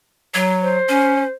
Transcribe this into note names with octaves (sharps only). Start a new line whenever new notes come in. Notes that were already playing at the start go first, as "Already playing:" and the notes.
F#3
C5
C#4